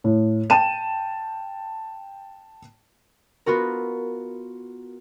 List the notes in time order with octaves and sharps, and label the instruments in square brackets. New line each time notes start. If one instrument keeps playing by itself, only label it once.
[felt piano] A2
G5 A5 D#7 E7
[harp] B3 F4 F#4 A#4